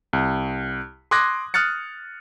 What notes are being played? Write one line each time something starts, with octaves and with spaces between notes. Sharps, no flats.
C2
C6 D6 D#6 F#6 G#6 A#6
D#6 F6 F#6 A6 C#7